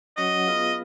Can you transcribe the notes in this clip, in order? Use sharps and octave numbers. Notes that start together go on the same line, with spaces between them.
F#3 C#4 F#4 C#5 D#5 F#5
B3 F4 G#4 B4 F5